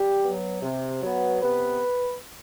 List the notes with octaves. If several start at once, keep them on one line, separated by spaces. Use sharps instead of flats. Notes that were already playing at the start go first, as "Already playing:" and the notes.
Already playing: G3 G4
F#3 B3
C3
F#3 B3
C3 B3 B4